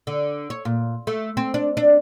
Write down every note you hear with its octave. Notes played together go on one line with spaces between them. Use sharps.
D3
C#5
A#2
A3
C4
D4
D4